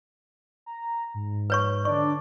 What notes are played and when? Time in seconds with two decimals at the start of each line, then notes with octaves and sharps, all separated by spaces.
0.66 A#5
1.14 G#2
1.50 B4 C#5 C#6
1.85 D3 D4 D5 C#6